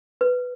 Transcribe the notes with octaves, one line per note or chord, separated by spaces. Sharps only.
B4